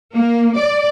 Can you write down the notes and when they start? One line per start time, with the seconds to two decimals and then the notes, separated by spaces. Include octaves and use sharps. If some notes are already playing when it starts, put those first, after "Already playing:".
0.15 A#3
0.57 D5